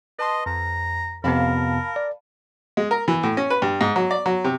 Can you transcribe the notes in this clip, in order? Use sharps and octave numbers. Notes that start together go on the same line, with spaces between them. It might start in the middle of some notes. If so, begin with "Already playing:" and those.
B4 D#5 A5 C6
F2 A#5
F2 C3 B3 A#4 F5 A5 B5
D5
G#3
A#4
E3
A2
C#4
B4
G2
G#2
F#3
D5
F#3
C3